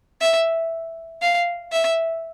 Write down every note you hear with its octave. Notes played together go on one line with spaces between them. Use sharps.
E5
F5
E5